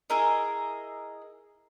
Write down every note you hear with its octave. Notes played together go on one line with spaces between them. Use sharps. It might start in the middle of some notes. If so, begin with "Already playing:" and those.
E4 G#4 A#4 D#5